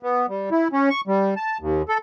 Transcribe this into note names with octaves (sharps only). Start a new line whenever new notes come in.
B3
G3
E4
C#4
C#6
G3
A5
D#2
A4